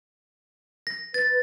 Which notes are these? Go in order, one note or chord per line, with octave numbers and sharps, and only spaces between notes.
A#6
B4 A6